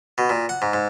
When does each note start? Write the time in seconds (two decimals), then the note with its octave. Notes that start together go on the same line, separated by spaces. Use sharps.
0.18 B2
0.30 A#2
0.49 F#5
0.62 G#2
0.73 G#2